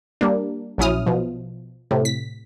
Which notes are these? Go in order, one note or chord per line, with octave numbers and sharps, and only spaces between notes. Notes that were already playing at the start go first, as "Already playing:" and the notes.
G3 A#3 D4
A#1 F#3 C#4 E4 D#6 F6
B2 F3
A2 C3
B6